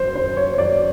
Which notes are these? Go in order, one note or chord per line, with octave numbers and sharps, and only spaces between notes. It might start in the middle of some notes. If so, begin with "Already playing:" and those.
Already playing: F#2 C5
F#2 C5
C#5
C#5
F#2 D5